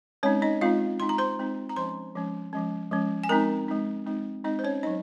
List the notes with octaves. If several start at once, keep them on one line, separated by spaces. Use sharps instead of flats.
G#3 C4 C#4 D#4 C#5
D#4 D#5
G#3 C4 D#4 F4 F5
G#3 C4 D#4 C6
A#5
C5 C6
G#3 C4 D#4
A#5
F3 G#3 C#4 C5 C6
F3 G#3 C#4
F3 G#3 C#4
F3 G#3 C#4
G#5
G#3 C4 D#4 A#4 A#5
G#3 C4 D#4
G#3 C4 D#4
G#3 C4 D#4 D#5
C5
C#4 C#5
F#3 C#4 D#4 D#5